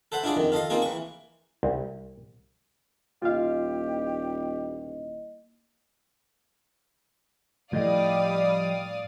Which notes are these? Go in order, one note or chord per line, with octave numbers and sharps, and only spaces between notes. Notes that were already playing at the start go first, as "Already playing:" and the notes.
A4 C5 E5 F#5 B5
D4 E4 F4 G#4 D5
F2 D#3
F4 A4 D#5 F5
A#3 C4 D#4 F4 G#4
E3 C#6
C2
D#1 A#3 E4 F4 G4 D#5 F5
A2 F3 G3 D5 D#5 F5 D#6